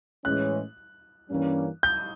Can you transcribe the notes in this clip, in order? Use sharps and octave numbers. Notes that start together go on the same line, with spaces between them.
A2 E3 G#3 C#4 F#6
G2 E3 G3 A#3 C#4
G6